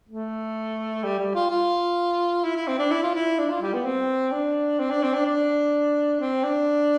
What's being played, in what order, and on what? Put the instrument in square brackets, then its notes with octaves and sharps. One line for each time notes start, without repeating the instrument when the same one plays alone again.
[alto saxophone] A3
G3
G3
F4
F4
E4
E4
C4
D4
E4
F4
E4
D4
F4
G3
B3
C4
D4
C4
D4
C4
D4
D4
C4
D4